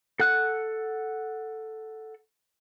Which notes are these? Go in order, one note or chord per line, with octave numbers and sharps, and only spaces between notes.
A4 F#5 F#6